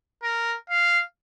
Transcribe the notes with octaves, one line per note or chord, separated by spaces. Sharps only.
A#4
F5